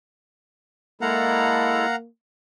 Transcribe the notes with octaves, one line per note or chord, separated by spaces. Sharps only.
G#3 A#3 E4 A4 F5 F#5 A#5